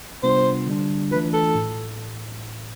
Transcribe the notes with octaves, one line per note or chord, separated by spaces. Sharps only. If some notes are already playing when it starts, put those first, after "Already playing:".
C3 G3 B3 D4 F4 C5
D3 G3 D4
E3 A3 D4 F4 B4
A4
A2